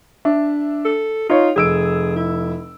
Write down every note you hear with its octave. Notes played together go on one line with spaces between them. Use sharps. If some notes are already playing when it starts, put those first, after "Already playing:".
D4 E5
A4
D#4 F4 C#5
F1 G#4 E6 D7
E4